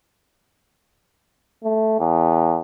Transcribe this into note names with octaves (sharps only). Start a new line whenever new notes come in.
A3
E2